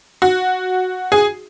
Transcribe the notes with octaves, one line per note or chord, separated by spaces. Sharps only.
F#4
G#4